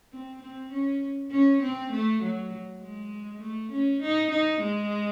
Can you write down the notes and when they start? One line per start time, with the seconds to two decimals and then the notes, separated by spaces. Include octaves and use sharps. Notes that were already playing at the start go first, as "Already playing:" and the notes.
0.13 C4
0.42 C4
0.72 C#4
1.31 C#4
1.62 C4
1.92 A3
2.22 F#3
2.82 G#3
3.41 A3
3.72 C#4
4.02 D#4
4.31 D#4
4.61 G#3